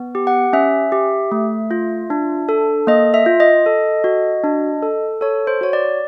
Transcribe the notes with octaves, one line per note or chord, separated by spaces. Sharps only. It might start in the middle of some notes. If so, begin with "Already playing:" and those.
Already playing: B3
G4
F#5
C#4 E5
G4
A3
F4
D4
A4
A#3 D#5
E5
F4
D#5
A4
F#4
D4
A4
A4 C#5
C5
F#4 C#5
D5